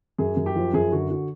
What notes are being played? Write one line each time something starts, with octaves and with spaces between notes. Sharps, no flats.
F#2 G#4
F#2
G4
F3
F#2 G#4
D3 F#4
F#4